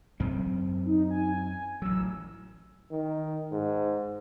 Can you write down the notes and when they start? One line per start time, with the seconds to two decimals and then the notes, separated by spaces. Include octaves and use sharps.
0.20 F#2 C4
0.86 D#4
1.11 G#5
1.82 A1 F#3 E6
2.91 D#3
3.52 G#2